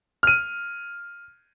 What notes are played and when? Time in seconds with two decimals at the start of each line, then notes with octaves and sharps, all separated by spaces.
0.23 F6 D#7